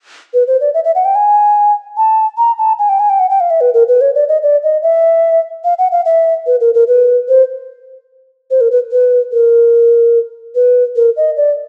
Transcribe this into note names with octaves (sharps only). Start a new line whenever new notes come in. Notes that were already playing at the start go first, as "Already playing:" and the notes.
B4
C5
D5
E5
E5
F#5
G5
G#5
A5
A#5
A5
G#5
G5
G#5
G5
F#5
G5
F5
E5
B4
A#4
B4
C#5
D5
D#5
D5
D#5
E5
F5
F#5
F5
E5
B4
A#4
A#4
B4
C5
C5
A#4
B4
B4
A#4
B4
A#4
D#5
D5